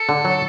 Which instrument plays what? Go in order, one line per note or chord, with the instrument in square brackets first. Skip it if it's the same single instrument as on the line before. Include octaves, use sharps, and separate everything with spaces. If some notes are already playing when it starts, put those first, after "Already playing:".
Already playing: [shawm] A4
[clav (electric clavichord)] D3
F#3